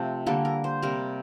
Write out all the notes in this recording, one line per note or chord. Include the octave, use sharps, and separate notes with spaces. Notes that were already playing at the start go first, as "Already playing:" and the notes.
Already playing: C3 F3 A3
D3 G3 A#3 A4
A#4
C5
C3 G3 A#3 A#4